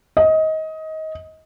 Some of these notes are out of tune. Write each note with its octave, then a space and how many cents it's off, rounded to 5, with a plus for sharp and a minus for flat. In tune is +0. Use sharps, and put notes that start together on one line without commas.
D#5 +20